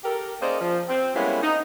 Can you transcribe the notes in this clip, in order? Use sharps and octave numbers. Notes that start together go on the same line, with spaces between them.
G4 A4 A#4
A#3 C#4 D#4 G#4 C5 D5
F3
C4
G3 G#3 A#3 B3 C#4 E4
D#4